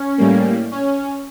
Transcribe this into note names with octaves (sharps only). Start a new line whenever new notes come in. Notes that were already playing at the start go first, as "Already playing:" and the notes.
Already playing: C#4
A2 G3 A#3
C#4